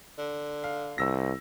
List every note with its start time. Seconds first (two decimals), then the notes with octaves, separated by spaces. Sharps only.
0.19 D3
0.64 F5
0.98 C2 E6 A#6